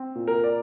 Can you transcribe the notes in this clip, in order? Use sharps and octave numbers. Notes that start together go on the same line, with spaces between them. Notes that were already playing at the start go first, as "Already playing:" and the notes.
Already playing: C4
A#2
A#4
D5